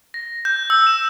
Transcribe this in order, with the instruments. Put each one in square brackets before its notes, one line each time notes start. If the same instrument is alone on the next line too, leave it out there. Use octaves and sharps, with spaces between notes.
[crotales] A#6
G6
E6
E7